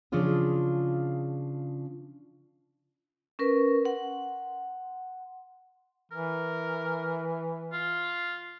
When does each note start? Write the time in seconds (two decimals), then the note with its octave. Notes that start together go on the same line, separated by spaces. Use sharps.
0.12 C#3 F3 D4 F4 G#4
3.39 C#4 A#4 B4
3.85 F#5 C6
6.12 E3 A#4
7.72 F4